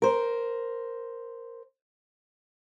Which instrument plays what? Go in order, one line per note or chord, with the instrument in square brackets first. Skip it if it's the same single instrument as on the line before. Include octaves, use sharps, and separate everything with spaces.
[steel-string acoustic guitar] A#4 C5